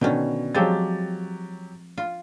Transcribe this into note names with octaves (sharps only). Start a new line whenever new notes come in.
B2 D3 D#3 C#4
F3 F#3 G#3 C4 G4 A6
F4